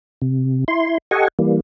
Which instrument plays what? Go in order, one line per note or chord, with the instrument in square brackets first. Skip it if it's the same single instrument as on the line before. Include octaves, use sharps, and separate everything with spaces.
[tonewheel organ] C3
E4 C6
G4 A4 D#5 F#5 G#5 C#6
E3 G3 A#3